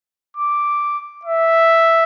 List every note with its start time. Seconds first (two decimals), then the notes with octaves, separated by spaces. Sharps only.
0.37 D6
1.25 E5